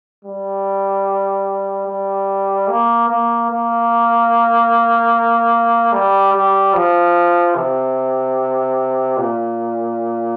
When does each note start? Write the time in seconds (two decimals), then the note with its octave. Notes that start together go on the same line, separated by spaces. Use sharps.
0.25 G3
1.87 G3
2.68 A#3
3.09 A#3
3.50 A#3
5.93 G3
6.33 G3
6.74 F3
7.55 C3
9.17 A#2